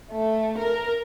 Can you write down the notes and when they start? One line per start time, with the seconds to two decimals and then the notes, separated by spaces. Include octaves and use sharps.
0.12 A3
0.58 A#4